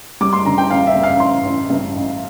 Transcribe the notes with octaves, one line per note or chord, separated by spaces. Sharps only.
G3 D6
C6
D3 A#5
G5
A1 F5
E5
G2
F5
A1 C6
A1
G2
A1